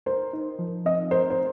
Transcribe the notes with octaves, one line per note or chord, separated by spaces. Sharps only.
A#4 C5
D#4
F3
C4 D#5
A#4 C5
C5